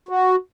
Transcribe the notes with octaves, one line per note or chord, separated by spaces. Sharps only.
F#4